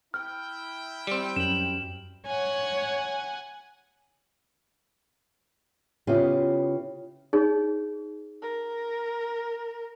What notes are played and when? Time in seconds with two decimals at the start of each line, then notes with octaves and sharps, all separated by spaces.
0.14 E4 G5 F6
1.07 G3 C4
1.36 F#2 E7 F#7
2.26 C#5 F#5 G#5
6.07 C#3 B3 C#4 E4 F4 G4
7.33 D#4 G#4 C#5
8.42 A#4